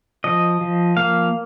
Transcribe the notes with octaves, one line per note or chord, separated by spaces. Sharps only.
F3 D#5
F3
A#3 F5